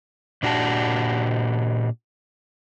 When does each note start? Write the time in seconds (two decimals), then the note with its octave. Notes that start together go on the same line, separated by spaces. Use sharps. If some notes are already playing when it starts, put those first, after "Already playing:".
0.43 A#2 D4 F#4 G4 A5